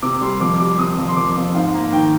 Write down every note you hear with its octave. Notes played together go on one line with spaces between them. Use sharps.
C3 D6
G3 C6
F2 D6
G3 D6
C3 D#6
F2
C6
F2 D6
F2
G#2 F5
A#3
D#3 G5